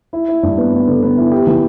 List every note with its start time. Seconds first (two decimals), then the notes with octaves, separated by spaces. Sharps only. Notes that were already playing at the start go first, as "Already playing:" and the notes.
0.13 E4
0.28 E4
0.43 G2
0.58 B3
0.73 B3
0.87 D3
1.03 B3
1.17 E4
1.32 G4
1.47 E3